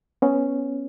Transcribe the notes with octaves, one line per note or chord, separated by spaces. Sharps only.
B3 C#4